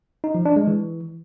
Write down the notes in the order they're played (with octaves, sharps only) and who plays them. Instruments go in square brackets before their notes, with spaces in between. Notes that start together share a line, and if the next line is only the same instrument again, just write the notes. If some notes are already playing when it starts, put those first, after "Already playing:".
[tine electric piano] D#4
F3
D4
G#3
E3